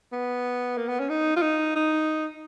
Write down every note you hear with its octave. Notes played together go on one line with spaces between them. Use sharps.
B3
A#3
B3
C#4
D#4
F4
D#4
D#4